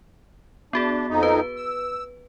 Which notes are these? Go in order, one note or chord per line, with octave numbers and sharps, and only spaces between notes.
B3 D4 F#4 G#4
F2 D#4
B4
E6